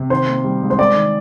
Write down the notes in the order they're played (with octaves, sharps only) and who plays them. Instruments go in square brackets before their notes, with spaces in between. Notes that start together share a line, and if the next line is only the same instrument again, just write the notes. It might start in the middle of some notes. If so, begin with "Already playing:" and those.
Already playing: [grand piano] C3
[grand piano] D#3 [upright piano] C5
[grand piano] A#3
G3
G#2
[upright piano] C5
[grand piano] G#3 [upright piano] D5
[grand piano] D#3